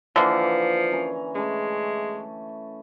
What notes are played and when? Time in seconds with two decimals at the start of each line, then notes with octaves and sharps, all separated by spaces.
0.16 D3 E3 F3 A#3
0.92 C#4 A#4
1.35 G#3 A3 C#4